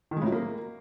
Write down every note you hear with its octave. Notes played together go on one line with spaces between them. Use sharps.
D#3
G#3
A2
F#3
A#3